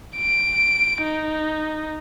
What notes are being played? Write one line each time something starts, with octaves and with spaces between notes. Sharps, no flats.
D7
D#4